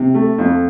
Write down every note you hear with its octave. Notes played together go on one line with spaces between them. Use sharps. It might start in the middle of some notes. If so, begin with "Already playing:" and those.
Already playing: C3
A3
F2